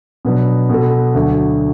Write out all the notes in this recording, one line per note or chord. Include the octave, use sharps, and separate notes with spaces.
B2 F#3 B3 D4
B2 B3 F#4 A4
D2 D3 F#3